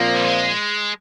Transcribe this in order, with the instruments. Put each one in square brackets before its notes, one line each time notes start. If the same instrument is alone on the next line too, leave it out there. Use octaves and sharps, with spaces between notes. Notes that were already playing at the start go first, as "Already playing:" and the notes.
Already playing: [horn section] A#2 F3 C4 [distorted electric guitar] A#3
[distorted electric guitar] G3
G#3